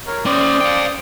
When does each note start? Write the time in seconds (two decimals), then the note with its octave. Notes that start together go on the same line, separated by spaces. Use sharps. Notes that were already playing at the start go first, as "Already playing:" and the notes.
0.07 A#4 C#5
0.26 C#4 C5 D5 G5 D#6
0.61 F5 G5